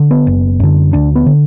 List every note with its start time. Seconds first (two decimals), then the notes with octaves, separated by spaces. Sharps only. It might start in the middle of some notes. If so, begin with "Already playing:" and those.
Already playing: D3
0.11 B3
0.27 F#1
0.60 F#2 D3
0.93 D2 D4
1.15 B3
1.26 D3